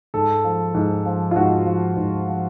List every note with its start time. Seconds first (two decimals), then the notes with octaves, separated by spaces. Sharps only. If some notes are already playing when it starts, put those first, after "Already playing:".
0.14 G#2 A4
0.44 F3
0.75 G#2
1.06 F3
1.31 F4
1.36 G#2 F#4
1.66 F3
1.97 G#2
2.28 F3